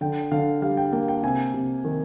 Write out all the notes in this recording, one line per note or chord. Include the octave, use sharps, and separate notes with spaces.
D3 G5
D3 F5
G3 F5
G5
A#3 G5
G5
C3 G#5
C3
D#3